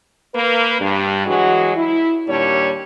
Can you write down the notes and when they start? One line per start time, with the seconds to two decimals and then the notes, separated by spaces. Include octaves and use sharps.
0.35 A#3 B4
0.81 G2
1.25 E3 F#3 G#3 F#4
1.76 E4
2.28 D#2 A#2 G3 D4 C#5